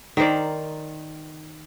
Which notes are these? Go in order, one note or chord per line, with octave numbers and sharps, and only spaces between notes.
D#3 A#4 C5 D5